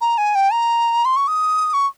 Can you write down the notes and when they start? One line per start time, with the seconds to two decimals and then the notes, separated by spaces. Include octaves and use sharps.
0.01 A#5
0.18 G#5
0.35 G5
0.52 A#5
1.05 C6
1.16 C#6
1.28 D#6
1.74 C#6